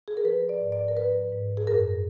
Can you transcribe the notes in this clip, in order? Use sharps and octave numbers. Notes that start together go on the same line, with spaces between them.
G#4
A#4
F3 B4
D5
G#2
D5
A#4
F3 B4
G#2
G#4
F#2 A#4